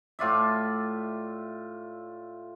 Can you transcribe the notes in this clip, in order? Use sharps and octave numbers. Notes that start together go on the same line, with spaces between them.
A2 F4 D5 E5